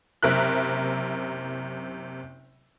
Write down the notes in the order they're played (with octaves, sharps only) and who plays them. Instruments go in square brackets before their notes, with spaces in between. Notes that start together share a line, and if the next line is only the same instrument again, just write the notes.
[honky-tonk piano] F#1 C3 A#4 E5 F#6